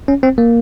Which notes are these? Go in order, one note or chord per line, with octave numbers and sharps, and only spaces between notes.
C#4
C4
A#3